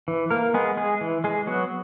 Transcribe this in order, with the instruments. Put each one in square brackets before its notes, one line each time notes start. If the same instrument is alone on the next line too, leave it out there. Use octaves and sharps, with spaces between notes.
[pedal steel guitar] E3
A#3 A#4
G#3 B3 G#4
G#3 G#4
E3
G#3 G#4
F#3 B3 F#4